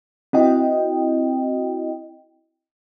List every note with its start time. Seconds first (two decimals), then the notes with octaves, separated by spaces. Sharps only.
0.33 C4 E4 F#4 D#5 G5